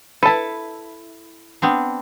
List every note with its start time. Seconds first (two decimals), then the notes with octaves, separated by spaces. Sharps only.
0.23 E4 A4 B4 A5
1.62 B3 C4 D4